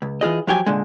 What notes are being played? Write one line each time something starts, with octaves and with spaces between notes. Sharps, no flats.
C#2
E3 F4 G#4 D#5
F3 F#3 G4 G#5
A#2 D3 G#3